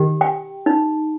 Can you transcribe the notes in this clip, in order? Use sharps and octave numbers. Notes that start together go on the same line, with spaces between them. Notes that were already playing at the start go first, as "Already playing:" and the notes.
Already playing: D#3 G4
G5
D#4